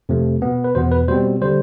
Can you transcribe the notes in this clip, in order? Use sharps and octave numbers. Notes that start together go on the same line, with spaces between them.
F2 C3 F3 A3
B2 B3
B4
E2 B2 B3 C5
B4
B2 G3 C4 C5
D3 G3 C5